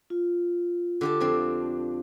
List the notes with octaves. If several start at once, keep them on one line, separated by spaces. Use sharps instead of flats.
F4
D3 G4 A5
F2 C4 D4